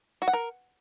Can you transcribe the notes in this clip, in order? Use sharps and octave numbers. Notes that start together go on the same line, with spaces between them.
F#4
F#5
A#4